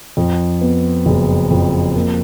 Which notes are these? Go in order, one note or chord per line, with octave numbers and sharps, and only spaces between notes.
F2
B3
F#1
F2
A#3